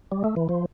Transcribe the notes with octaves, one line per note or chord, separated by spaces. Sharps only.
G3
A3
E3
F3